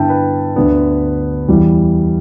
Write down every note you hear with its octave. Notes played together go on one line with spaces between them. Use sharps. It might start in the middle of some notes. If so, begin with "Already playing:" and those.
Already playing: G2 D3 B3 E4 E5 G5 A5
B4
D2 D3 B3 D4
E2 E3 G3